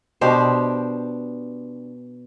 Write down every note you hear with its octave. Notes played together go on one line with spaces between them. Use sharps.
B2 D4 G4 C5